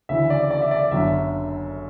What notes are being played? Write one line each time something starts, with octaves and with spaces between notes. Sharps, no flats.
D2 C#3 E3 E5
D5
D5
E5
D5
G1 F#2 D3 E5